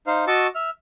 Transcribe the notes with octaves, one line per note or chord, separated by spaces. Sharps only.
D#4 C5 F5
F#4 D#5 A5 C#6 D6 E6
E5 F6